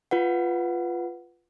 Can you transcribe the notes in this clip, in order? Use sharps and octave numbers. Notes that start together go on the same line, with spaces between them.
F4 B4 F#5